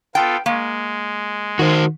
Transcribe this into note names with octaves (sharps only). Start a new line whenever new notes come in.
B3 F4 A4 G5
G#3 A#3
D#3 F#4 C5